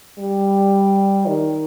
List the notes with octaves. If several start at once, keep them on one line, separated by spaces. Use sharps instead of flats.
G3
D#3